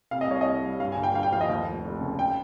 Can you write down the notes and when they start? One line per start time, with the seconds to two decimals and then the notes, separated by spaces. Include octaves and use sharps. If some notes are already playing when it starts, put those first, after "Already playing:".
0.11 C3 F5
0.21 D#5
0.27 C2 C#5
0.41 C2 D#5
0.63 G3
0.80 G2 F5
0.92 G#5
0.97 G1
1.03 G5
1.14 G1 F5
1.23 G5
1.32 F3 F5
1.41 D#5
1.50 D#2
1.66 F1
1.84 F1
2.01 C#3
2.19 G5